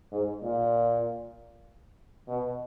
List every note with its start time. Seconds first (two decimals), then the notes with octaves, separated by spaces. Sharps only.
0.12 G#2
0.42 A#2
2.28 B2